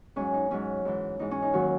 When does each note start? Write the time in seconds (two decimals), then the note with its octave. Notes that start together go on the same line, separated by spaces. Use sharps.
0.16 G#2 F#3 C#4
0.34 D#4
0.51 G#2 F#3 C#4
0.85 G#2 E3
1.19 G#2 E3 D#4
1.31 C#4
1.42 D#4
1.53 D#2 D#3 F#3 F#4